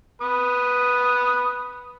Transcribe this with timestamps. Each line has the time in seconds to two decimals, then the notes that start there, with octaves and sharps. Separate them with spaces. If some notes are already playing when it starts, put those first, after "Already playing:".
0.22 B4 D#6